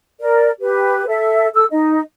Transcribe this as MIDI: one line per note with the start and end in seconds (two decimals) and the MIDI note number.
0.20 0.50 70
0.20 0.50 74
0.60 1.05 67
0.60 1.05 71
1.07 1.47 69
1.07 1.47 76
1.54 1.65 69
1.54 1.65 88
1.71 2.00 63
1.71 2.00 75